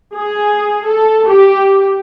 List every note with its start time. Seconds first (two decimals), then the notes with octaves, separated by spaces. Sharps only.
0.17 G#4
0.86 A4
1.29 G4